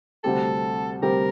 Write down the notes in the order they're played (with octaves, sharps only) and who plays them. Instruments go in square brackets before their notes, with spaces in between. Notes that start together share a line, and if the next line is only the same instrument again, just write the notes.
[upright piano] D2 C3 G3 C4 G4 [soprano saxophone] A4
[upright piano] D2 C3 G3 C4 G4 [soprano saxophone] A#4